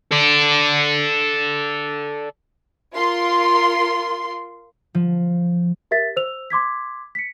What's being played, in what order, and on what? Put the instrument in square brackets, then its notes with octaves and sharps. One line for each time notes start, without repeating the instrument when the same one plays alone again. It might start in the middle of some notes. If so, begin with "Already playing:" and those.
[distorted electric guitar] A4 D5
[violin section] F4 A#4 C6
[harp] F3
[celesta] G4 A#4 E5 A6 B6
C5 E6 F7
C6 D6 G#6 B6
B6 C#7